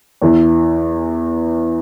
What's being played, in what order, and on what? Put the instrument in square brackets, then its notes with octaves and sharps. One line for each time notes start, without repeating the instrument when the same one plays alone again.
[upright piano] E2 E3